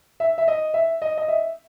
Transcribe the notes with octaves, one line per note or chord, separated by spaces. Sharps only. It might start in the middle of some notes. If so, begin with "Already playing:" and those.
E5
E5
D#5
E5
D#5
D#5
E5